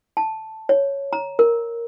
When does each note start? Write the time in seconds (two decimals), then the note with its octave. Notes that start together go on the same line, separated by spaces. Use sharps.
0.17 A5
0.69 C#5
1.13 A#5
1.39 A#4